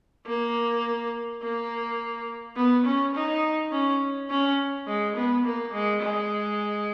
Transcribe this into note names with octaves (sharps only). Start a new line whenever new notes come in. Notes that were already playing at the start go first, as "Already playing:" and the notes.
A#3
A#3
B3
C#4
D#4
C#4
C#4
G#3
B3
A#3
G#3
G#3